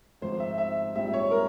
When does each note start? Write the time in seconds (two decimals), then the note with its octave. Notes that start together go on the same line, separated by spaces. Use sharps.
0.22 G#1 G#2 F3 C5
0.40 E5
0.58 E5
0.95 A#1 G#2 G3 C4 E5
1.14 C#5
1.31 A#4